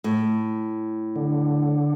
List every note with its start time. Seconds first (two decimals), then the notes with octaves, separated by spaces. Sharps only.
0.04 A2
1.16 D3